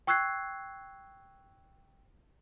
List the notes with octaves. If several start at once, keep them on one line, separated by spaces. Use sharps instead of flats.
G5 C#6 E6 F#6 G#6 C7